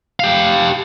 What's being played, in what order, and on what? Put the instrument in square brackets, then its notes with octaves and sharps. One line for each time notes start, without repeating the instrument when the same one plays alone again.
[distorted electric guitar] G4 F5